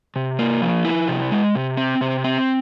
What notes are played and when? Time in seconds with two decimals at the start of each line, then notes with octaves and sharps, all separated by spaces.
0.16 C3
0.39 A#3
0.62 F3
0.85 E4
1.08 C3
1.31 G#3
1.55 C3
1.77 C4
2.01 C3
2.24 C4